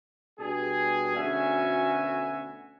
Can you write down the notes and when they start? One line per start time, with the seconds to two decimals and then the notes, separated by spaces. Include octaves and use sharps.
0.40 B2 G3 D4 G#4
1.17 D2 B2 C#4 F#4 E5 G#5